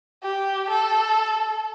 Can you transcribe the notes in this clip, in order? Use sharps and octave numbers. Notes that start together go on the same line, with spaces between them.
G4
A4